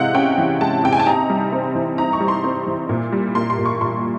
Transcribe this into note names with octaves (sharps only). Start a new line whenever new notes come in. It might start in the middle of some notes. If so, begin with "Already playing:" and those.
Already playing: C3 E3 G#3 D#5 F5 F#5
C#4 G5
E3
G#3 A5
C3 G5
G#5
A5
D#4 A#5
G3
C4
E3
D#4 A#5
C#6
G3
C6
C4
E3
A#2
G3
A#3 C6
C6
A#2
C#6
A#2 C6